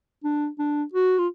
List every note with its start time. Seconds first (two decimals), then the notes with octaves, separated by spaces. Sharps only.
0.24 D4
0.59 D4
0.93 F#4
1.18 F4